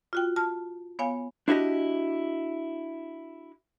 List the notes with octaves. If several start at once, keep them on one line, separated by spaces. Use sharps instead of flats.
F4 F#4 G5
A5 F6
B3 C#5 F5 G#5
D4 E4 F#4 G4 D#5